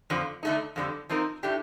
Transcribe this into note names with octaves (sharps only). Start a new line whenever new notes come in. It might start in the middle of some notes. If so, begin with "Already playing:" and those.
F2 D3 F3
D3 A3 D#4
F2 D3 G3
F3 C4 D#4 A#4
A2 A3 D4 G4